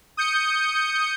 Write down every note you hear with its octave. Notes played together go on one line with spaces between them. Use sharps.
D#6 G6 C#7